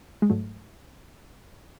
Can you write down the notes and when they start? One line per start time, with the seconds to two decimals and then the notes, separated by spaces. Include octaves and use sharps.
0.22 G#3
0.30 G#2 F#3 A3